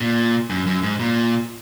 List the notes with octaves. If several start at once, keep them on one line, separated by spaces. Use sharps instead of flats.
A#2
F#2
F#2
G#2
A#2